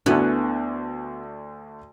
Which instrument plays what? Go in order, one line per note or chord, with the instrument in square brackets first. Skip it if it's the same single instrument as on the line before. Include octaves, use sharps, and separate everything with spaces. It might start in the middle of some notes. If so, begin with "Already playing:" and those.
[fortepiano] D2 D3 [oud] B3 [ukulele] E4 F#4 G#5